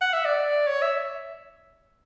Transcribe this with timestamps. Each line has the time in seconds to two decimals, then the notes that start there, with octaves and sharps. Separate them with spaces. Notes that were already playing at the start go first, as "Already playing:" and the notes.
0.01 F#5
0.13 E5
0.25 D5
0.67 C#5
0.82 E5